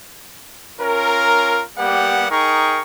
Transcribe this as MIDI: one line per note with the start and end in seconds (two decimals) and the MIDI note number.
0.80 1.63 61
0.80 1.63 65
0.80 1.63 70
1.77 2.26 55
1.77 2.26 58
1.77 2.26 59
1.77 2.26 67
1.77 2.26 78
2.30 2.81 63
2.30 2.81 68
2.30 2.81 70
2.30 2.81 79
2.30 2.81 85